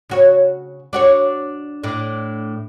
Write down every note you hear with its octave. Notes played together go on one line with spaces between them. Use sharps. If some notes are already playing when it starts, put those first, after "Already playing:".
C#3 F#4 C#5
D4 F#4 C#5
A2 D4